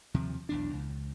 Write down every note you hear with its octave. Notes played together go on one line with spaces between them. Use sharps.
D#2 C3 F3
B1 E2 D4
C#2